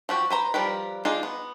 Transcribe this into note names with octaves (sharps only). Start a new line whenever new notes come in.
F3 F#4 G4
B4 C5 A#5
F3 G3 A#4 B4
D4 D#4 F4 G#4 A4
B3